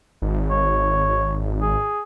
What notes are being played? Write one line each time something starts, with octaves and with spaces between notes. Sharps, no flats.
G#1
C#5
G#4